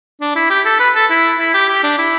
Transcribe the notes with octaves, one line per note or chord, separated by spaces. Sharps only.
D4
E4
G4
A4
B4
A4
E4
E4
G4
G4
D4
E4